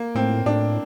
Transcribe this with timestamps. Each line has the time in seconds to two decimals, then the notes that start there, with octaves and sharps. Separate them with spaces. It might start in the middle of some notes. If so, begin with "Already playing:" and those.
Already playing: A#3
0.15 A2 C4
0.46 A2 D4